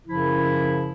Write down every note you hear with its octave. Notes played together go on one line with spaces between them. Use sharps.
F#2 C#3 F3 E4